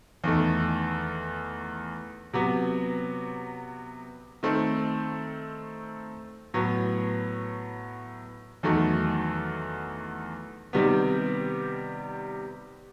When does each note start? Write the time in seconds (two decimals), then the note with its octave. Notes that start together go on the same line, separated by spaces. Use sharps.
0.24 E2 D#3 A3
2.33 C3 F#3 B3
4.43 D#3 A3 C4
6.54 A2 F#3 B3
8.63 E2 D#3 F#3 A3
10.73 C3 D#3 G3 B3